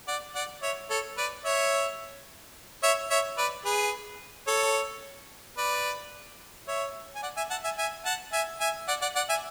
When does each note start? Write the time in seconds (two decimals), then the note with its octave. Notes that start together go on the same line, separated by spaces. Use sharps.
0.08 D5 F#5
0.35 D5 F#5
0.62 C#5 E5
0.90 A4 C#5
1.17 B4 D5
1.45 C#5 E5
2.83 C#5 E5
3.10 C#5 E5
3.38 B4 D5
3.65 G#4 B4
4.47 A4 C#5
5.58 B4 D5
6.68 C#5 E5
7.15 G#5
7.23 D5 F#5
7.37 E5 G#5
7.50 F#5 A5
7.64 E5 G#5
7.78 E5 G#5
8.05 F#5 A5
8.33 E5 G#5
8.60 E5 G#5
8.88 D5 F#5
9.02 D5 F#5
9.16 D5 F#5
9.29 E5 G#5